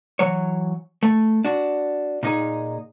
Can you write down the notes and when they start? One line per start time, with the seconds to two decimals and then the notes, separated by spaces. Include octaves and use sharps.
0.19 E3 F#3 C#5
1.03 A3
1.44 D4 F#4
2.23 A#2 D#4 G#4